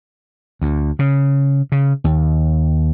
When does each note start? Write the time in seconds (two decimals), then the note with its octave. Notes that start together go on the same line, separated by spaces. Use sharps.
0.62 D2
0.99 C#3
1.72 C#3
2.04 D#2